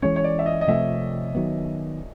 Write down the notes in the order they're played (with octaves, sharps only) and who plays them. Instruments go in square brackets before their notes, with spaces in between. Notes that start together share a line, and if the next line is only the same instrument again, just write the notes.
[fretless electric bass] E3 G#3 C#4 [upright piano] C#5
[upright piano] C#5
D5
E5
D#5
D#5
[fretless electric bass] C3 F3 A3 C4 [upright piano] E5
[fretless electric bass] D#3 F#3 B3